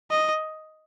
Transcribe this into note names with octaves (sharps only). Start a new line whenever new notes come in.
D#5